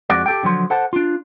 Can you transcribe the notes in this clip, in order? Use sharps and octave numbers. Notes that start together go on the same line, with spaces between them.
F2 G#3 F#4 D5
G4 A4 G5
D3 F3 F#3 C6
A4 C5 F#5 A5
D4 F4